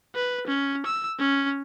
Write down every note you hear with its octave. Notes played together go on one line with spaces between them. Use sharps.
B4
C#4
E6
C#4